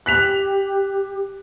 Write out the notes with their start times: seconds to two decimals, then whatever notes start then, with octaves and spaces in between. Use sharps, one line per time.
0.06 G4 F#6 B6 F7